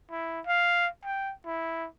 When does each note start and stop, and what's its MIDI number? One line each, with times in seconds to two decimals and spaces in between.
0.11 0.40 64
0.46 0.88 77
1.04 1.33 79
1.46 1.87 64